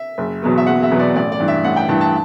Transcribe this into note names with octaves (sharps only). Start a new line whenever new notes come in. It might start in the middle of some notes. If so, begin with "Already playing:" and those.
Already playing: E5
F#1
E2 B2 F#3 B3
E5
F#1 F#5
E5
E2 B2 F#3 B3
D5
A1 D5
D5
G2 E3
E5
A1 F#5
G5
G2 E3 A5
A5